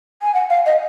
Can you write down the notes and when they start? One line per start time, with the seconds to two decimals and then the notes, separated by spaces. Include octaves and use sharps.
0.22 G#5
0.34 F#5
0.50 F5
0.66 D#5